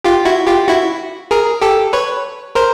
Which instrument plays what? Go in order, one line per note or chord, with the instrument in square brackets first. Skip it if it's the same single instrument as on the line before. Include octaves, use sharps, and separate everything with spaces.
[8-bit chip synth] F4 G4
E4 F#4
F4 G4
E4 F#4
G#4 A#4
G4 A4
B4 C#5
A#4 C5